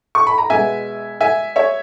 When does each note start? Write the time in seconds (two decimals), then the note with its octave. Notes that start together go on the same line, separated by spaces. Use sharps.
0.15 C#6
0.27 B5
0.38 A#5
0.50 B2 G#3 B3 E5 G#5
1.21 E5 G#5
1.56 C#5 E5